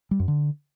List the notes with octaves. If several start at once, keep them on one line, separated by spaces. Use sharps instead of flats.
G3
F#2
D3